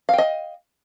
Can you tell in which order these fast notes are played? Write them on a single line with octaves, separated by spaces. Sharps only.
F5 G5 D#5